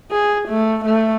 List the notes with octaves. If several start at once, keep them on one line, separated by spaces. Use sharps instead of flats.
G#4
A3
A3